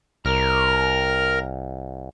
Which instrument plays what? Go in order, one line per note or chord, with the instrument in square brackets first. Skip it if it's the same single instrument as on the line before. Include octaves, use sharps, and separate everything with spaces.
[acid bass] C2 [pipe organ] A#4 F6